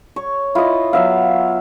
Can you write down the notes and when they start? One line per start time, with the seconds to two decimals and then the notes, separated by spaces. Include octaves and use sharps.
0.16 C#5
0.55 E4 F4 D#5
0.93 F#3 B3 E5 F5